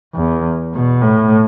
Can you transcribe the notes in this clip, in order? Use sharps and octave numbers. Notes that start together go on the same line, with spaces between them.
E2
B2
A2